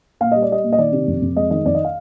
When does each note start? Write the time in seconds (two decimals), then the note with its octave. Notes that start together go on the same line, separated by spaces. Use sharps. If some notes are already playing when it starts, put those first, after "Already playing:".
0.21 A#2 F5
0.32 G3 D#5
0.42 D5
0.49 G3 D#5
0.64 A#2
0.72 D#5
0.79 D#3 D5
0.93 C3
1.08 F2
1.22 F2
1.36 G#3 D#5
1.51 D#3 D#5
1.65 F2 D5
1.75 D#5
1.84 F5